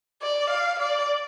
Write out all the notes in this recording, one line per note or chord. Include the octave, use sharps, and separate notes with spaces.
D5
F5
D5